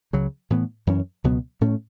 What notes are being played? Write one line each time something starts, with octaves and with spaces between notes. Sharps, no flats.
C#2 C#3 F#3
A2 E3 B3
F#2 E3 C#4
C#2 B2 F#3 B3
A2 A3 C#4